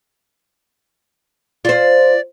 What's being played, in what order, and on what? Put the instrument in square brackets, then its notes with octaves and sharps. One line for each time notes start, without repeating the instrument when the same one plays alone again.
[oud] F4 C5 [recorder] D5